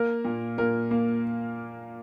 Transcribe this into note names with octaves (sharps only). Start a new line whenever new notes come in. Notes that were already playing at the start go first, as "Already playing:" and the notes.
Already playing: A#3 A#4
A#2
A#2 A#4
A#3